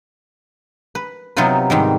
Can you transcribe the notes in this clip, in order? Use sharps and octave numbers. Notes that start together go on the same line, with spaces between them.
B4
C3 F#3 B3 D#4 F4 B4
G#2 D#3 G3